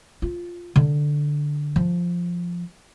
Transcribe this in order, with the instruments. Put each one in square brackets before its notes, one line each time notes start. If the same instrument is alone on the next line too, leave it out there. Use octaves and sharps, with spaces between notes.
[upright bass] F4
D3
F3